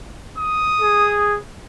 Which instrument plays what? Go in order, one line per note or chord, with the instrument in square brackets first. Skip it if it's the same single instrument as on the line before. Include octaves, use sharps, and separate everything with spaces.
[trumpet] D#6
[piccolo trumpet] G#4